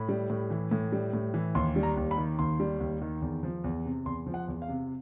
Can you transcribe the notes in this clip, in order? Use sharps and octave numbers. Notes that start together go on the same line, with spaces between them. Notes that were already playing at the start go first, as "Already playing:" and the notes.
Already playing: A2 B5
G3
A2
E3
A2
G3
A2
E3
D#2 C6
G3
A#5
D#2
B5
D#3
D#2 C6
G3
D#2
D#3
E2
F3
E2
C3
E2 C6
F3
F#5
E2
F5
C3